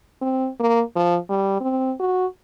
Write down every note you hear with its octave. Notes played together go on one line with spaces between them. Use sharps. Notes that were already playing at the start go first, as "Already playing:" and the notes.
C4
A#3
F3
G3
C4
F#4